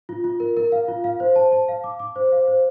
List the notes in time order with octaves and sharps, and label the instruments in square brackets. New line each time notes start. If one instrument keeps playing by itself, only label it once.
[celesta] F4
F4
A#4
A#4
F5
F4
F5
C5
A5
A5
F5
D6
D6
C5
F5
C5